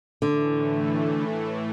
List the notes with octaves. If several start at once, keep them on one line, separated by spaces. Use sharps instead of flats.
A2 D3 E3 A3